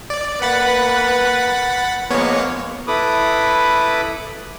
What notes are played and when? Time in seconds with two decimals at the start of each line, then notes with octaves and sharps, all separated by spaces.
0.10 D5
0.42 A#3 B4 F#5 B5 A6
2.11 F3 G#3 A#3 B3 C#5
2.87 E4 A4 B4 B5 D6 D#6